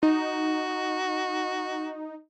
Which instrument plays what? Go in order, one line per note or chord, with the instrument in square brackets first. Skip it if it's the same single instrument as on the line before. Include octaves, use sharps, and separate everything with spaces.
[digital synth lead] D#4 [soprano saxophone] F#4